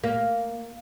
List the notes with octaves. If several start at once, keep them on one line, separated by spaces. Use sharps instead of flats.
A#3